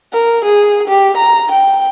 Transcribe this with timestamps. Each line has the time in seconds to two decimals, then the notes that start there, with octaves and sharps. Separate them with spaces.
0.13 A#4
0.45 G#4
0.88 G4
1.18 A#5
1.52 G5